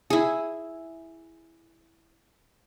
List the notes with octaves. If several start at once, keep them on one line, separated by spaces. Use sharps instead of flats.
E4 G#4